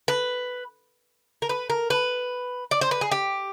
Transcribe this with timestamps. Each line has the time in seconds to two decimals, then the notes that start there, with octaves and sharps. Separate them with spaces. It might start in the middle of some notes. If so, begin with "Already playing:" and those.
0.08 B4
1.42 A#4
1.49 B4
1.70 A#4
1.90 B4
2.71 D5
2.81 C5
2.91 B4
3.01 G#4
3.11 G4